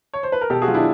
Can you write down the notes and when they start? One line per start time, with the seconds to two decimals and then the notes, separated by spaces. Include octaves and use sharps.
0.14 C#5
0.23 C5
0.32 B4
0.41 A#4
0.50 B2 G4 A4
0.62 F#4 G#4
0.68 F#3 F4
0.74 D4 E4